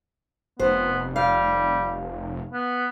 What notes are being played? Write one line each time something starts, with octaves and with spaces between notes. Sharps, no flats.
F1 B3 C5
G3 F5
B3